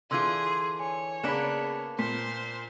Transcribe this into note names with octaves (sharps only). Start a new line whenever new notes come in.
D3 E3 F4 G#4 C6 E6 G#6
C#5 G#5
C#3 A#3 B3 D4 G#4 B5 B6 E7
A#2 C5 B6